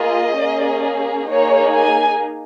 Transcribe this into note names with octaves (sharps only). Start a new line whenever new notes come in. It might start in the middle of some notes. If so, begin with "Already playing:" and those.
Already playing: A#3 F4 G#4 D#5
A#3 C#4 G#4
A#3 D#4 G#4 C#5
G#5